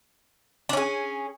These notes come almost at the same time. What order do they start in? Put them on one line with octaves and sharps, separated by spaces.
D4 C#4 G#4